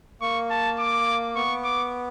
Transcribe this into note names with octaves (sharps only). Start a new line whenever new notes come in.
A#3 C#6
A5
D6
B3 C#6
D6